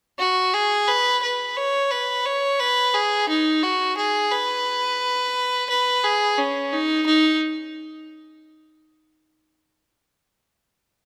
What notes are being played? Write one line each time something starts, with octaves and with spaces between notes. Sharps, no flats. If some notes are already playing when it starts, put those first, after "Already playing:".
F#4
G#4
B4
B4
C#5
B4
C#5
B4
G#4
D#4
F#4
G#4
B4
B4
G#4
C#4
D#4
D#4